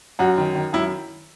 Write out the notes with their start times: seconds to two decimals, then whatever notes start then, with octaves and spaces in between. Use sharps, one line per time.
0.19 F#2 F#4
0.38 D#3
0.55 D#3
0.73 F#2 E4